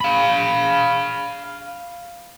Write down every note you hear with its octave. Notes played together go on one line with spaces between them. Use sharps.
F5 B5